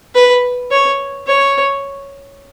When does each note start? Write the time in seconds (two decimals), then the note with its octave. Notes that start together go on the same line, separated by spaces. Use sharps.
0.15 B4
0.71 C#5
1.27 C#5